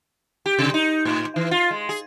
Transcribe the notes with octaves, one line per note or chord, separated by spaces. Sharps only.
G4
C3
D#4
A2
E3
F4
G#3
G#4